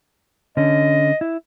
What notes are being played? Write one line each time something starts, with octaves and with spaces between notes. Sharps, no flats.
D3 C#4 D#5
E4